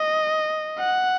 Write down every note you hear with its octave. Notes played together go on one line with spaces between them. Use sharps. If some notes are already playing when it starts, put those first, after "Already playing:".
Already playing: D#5
F#5